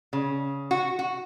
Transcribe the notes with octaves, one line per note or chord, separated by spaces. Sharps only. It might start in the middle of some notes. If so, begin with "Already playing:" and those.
C#3
F#4
F#4